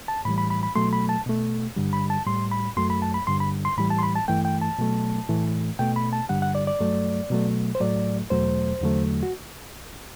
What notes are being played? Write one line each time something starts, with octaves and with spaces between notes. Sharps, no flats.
A5
A2 E3 G3 B5
B5
B5
B5
B2 F#3 A3 C6
B5
A5
B2 A3
G2 D3 G3
B5
A5
A2 G3 C6
B5
F#2 F#3 A3 C6
B5
A5
B5
G2 D3 G3 C6
B5
C6
A2 E3 G3 B5
A5
C6
B5
A5
G2 E3 A3 G5
G5
A5
B2 F#3 A3
A2 E3 A3
B2 A3 G5
B5
A5
G2 D3 G3 F#5
F#5
D5
D5
G2 F#3 A3
B2 F#3 A3
C5
A2 F#3 A3 D5
E2 B2 F#3 A3 C5
E2 D3 F#3 A3
F#4